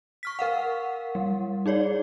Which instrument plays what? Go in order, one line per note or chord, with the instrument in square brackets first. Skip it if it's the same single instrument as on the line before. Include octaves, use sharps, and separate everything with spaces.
[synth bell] C#6 F6 B6
A#4 F5 F#5
G3
D#4 G#4 C#5 D5